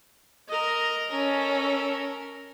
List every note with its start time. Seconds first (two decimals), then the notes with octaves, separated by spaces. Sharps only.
0.48 A#4 D#5
1.11 C#4 A4 A#4